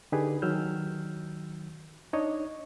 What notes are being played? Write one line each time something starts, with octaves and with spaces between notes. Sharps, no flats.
D3 D#4 G4 G#4 B4
D#3 F#3 E6 F6 G6
D4 D#4 C#5 D#5